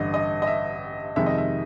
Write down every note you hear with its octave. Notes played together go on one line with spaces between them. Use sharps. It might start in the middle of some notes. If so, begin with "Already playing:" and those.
Already playing: A1 G2 D3 D#5
D#5
D#5
E5
F2 C3 D#3 G#3 E5
D#5
E5